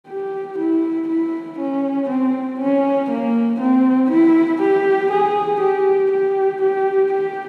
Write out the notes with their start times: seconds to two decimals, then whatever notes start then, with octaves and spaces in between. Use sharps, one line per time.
0.09 G4
0.59 E4
1.08 E4
1.59 C#4
2.09 C4
2.60 C#4
3.11 A#3
3.60 C4
4.11 E4
4.62 G4
5.12 G#4
5.61 G4
6.11 G4
6.62 G4
7.13 G4